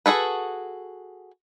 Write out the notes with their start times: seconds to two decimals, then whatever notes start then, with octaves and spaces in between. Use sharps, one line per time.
0.06 F#4 G#4 A4 B4